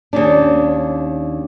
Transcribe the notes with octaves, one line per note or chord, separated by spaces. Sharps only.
D#2 C#4 D4